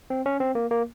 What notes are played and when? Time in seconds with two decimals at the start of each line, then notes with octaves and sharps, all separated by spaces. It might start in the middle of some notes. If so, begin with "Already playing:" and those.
0.10 C4
0.26 C#4
0.40 C4
0.55 A#3
0.71 A#3